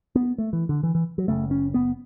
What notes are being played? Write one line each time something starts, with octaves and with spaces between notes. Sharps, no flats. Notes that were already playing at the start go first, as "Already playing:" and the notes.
B3
A3
E3
D3
E3
E3
F#3
F#1 E2 C#3 A3
C#4
B3